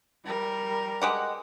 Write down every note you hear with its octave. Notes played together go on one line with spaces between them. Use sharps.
G3 A#4
G#3 G4 F#5